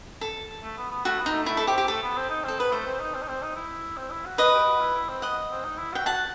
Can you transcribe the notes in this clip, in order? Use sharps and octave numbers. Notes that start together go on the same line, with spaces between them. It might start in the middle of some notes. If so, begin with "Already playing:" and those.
A4
A3
B3
B3
A3 F#4
B3
D#4
A3
A3 E4
A4
C4 G4
G4
A3 A4
B3
C4
D#4
C4 A4
B3 B4
A3 C5
C4
D#4
C4
D#4
C4
D#4
E4
C4
E4
F#4
B4 D#5
G4
F#4
E4
E4
C4
B3 D#5 F#5
C4
D#4
E4
F#4 G5
F#4 F#5 A5